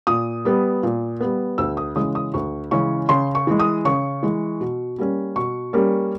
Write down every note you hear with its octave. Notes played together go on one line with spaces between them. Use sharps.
A#2 D#6
G3 B3
A#2
G3 B3
D2 E6
D#6
C#3 E3 G#3 C#4 D#6
D#6
D2 C#6
C#3 E3 G#3 C#4 C#6
C#3 C6
C#6
E3 G#3
D#6
C#3 C#6
E3 G#3
B2
G3 A#3 C#4
B2 C#6
G3 A#3 C#4